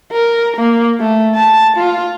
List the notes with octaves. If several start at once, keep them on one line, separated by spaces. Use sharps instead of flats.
A#4
A#3
A3
A5
F4